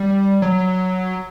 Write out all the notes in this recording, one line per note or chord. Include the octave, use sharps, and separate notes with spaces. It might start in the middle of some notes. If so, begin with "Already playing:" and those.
Already playing: G3
F#3